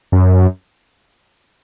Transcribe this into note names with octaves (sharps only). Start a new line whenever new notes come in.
F#2